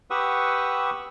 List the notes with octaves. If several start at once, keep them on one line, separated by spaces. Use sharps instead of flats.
G4 B4 F#5 C#6 D#6 E6